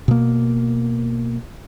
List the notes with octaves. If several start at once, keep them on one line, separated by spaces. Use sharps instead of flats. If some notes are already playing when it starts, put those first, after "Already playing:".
B2 A#3